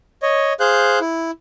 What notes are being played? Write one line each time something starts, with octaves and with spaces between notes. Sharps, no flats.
C#5 D#5
G#4 C5 F5 F#6 G6
E4